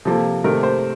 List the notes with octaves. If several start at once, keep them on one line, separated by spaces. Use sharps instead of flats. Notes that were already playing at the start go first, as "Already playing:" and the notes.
C3 F3 A#3 A4
C3 D#3 A3 A#4
C5